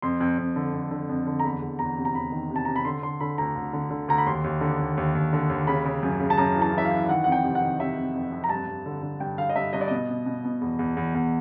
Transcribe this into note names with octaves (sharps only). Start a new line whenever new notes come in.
F2 C6
F2
F2
D3
F2
D3
F2
D3
A#5
E2 B5
E2
E2 A#5
C3
A#5
E2 B5
D#3
C3
A5
C3 A#5
B5
D3 C6
D3 C6
D3 B5
D2 A#5
D2
D3
D3
D2 A#5
B5
D#2 C6
D#2
D3
D#2
D#2
D#2
D3
D#2
C#3 B5
C#3
F#2
C#3
A5
F#2 A#5
E3
A5
E3 E5
F5
E3
D#3 F#5
F2 F#5
G5
C3
F#5
D#3
C3 E5
C3
F2
F2
A#5
G2 A5
G2
D3
D3
G2 G5
D3 F5
D#5
G2 E5
G2 D#5
D5
B2 D#5
B2
B2
B2
E2
E2
E2
E2